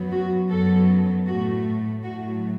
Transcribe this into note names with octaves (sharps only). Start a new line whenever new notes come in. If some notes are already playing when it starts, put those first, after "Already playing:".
Already playing: F#2 F#3 B3
F#4
F#2 F#3 B3 A4
A2 A3 F#4
A2 F#3 A3 F#4